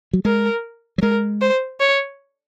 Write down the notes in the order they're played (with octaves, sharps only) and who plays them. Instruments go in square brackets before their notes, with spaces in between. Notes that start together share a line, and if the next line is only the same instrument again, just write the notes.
[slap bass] F#3
[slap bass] G#3 [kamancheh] A#4
[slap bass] F#3
[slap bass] G#3 [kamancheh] A#4
[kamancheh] C5
C#5